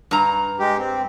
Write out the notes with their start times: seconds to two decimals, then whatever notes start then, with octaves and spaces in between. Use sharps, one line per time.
0.11 G2 A#5
0.60 G#3 G4
0.78 C4